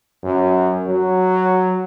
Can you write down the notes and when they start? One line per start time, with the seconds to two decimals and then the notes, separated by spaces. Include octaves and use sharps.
0.23 F#2
0.87 F#3